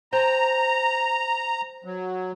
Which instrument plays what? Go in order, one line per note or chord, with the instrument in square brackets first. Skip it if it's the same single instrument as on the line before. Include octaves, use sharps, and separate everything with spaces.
[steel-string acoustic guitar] C5 G5 A5 [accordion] A#5
[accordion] F#3